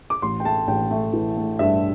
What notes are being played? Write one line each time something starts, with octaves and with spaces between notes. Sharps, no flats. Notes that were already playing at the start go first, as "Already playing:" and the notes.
D6
A1 C6
G5
A3 A5
A1 G5
A3
E3
A3
G2 E5